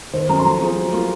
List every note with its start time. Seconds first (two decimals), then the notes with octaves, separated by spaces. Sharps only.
0.13 D#3 C5
0.29 F#3 C#4 A#5
0.39 C6
0.45 F3 A#5
0.60 C4 F4 G#4
0.76 F#3
0.93 A#3 F4 G#4